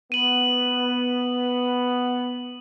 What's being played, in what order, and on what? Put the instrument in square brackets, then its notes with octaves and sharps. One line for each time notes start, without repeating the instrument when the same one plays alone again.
[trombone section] B3 [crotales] D#7 F#7